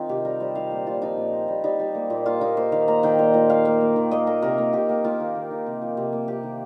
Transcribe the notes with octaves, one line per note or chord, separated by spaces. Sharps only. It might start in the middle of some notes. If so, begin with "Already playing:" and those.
Already playing: D#3 C4 D#4 F4
C3 G4
G3 A#4
G3 C5
D#3 F5
A#2
A#2 F4
F3 D#4
A#2
C4
G3
G3 D#4
G3
A#3
A#2
A#3 F4
A#3 D#4
A#3 C5
D#3 F5
A#3 A#5
D#3 G5
A#2
A#2
A#3 F5
A#3
A#3
D#3
A#3 D#5
A#3 A#4
C3 A#4
A#3
A#3 G4
A#3
A#3 F4
D#3
D#3
D#3
C3
F3
C3
A#3
C3 G4
D#3